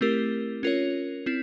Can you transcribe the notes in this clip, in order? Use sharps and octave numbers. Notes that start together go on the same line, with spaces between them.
A3 C4 E4 G4 A#4
C#4 F4 A#4 C#5
C4 E4